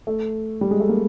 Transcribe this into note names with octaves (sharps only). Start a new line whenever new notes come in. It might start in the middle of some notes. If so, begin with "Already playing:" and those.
A3
G3
G#3
A3
A#3